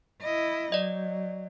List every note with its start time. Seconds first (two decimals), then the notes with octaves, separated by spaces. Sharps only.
0.22 E4 D#5
0.72 F#3 D5 D#5